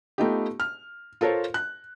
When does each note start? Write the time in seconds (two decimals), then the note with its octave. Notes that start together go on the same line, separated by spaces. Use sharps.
0.18 A3 B3 D#4 F4 G4
0.60 F6
1.21 F4 A4 A#4 C5 C#5
1.54 F#6